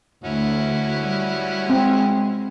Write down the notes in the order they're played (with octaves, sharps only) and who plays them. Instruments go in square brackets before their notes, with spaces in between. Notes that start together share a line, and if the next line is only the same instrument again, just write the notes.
[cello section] D2 [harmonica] C#4 E4 F#4
[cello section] G3
[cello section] G#3 [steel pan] C4